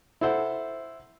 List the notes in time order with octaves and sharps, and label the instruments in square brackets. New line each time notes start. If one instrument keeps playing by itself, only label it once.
[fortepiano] E4 A4 C5 F#5